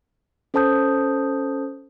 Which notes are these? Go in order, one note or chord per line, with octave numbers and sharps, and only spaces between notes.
C#4 A4 C5 A5 D#6 G6